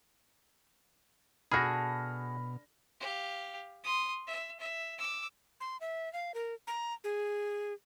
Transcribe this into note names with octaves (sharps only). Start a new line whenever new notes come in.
B2 D4 F#4 G#4 A4 B5 F6 A#6
G4 F5
C6 D#6
E5
E5
D6 E6
C6
E5
F5
A#4
A#5
G#4